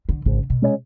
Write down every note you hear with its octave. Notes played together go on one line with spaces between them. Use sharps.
D3
G#1 C#3
B2
G#3 C#4